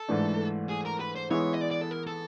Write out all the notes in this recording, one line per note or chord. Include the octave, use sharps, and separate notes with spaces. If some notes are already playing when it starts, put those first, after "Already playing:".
Already playing: A4
G#2 E3 A3 D4
G#4
A#4
B4
C5
E3 G#3 B3 E4 C#5
D#5
D5
D5
A4
A#4
A4